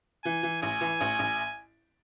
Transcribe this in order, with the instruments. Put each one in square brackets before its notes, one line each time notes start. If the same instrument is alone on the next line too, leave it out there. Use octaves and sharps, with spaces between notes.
[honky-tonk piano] E3 [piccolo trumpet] G#5
[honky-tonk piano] E3
[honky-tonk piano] A1 [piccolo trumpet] G#5
[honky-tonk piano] E3
A1
A1